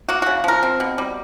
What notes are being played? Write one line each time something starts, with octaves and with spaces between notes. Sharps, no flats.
A#3 F#4
C#3 F#4
F3 A#4
C4
B2
G3